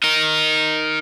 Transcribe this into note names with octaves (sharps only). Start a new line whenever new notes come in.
D#4 A#4